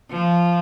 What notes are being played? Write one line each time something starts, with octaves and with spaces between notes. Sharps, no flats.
F3